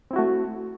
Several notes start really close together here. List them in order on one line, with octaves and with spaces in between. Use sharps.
C4 E4 F#4 A3